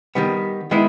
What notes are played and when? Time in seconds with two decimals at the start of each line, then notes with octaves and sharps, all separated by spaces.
0.15 D#3 G3 B3
0.71 D#3 G#3 B3 E4